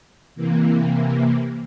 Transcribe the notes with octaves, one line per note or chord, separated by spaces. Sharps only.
C3 E3 A#3